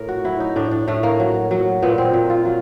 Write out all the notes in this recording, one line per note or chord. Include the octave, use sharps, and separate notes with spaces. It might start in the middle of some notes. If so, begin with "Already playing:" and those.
Already playing: A2 A#4
F#4
F#3 E4
D#4
A2 D4
D4
A2 A3
A#3
F#3
F#3
A#2 B3
C4
A#2
F4
F#3 F4